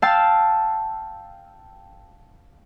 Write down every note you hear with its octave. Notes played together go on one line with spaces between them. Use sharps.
F5 G5 A5 E6